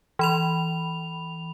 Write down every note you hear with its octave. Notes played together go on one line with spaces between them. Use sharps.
E3 B5 F7